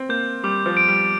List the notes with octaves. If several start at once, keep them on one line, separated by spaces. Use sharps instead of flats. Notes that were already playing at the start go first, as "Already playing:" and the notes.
Already playing: C4
A#3 G6
G3 D6
F3
D7
G3